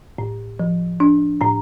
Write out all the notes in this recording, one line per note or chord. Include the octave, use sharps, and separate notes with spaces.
A2
F3
D4
A2 A#5